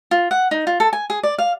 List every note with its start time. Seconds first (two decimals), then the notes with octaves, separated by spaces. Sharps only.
0.11 F4
0.31 F#5
0.51 D#4
0.67 F4
0.80 A4
0.93 G#5
1.10 G#4
1.23 D5
1.38 F5